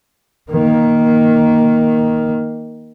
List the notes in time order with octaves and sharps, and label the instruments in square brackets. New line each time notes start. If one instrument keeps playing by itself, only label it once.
[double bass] D#3 A#3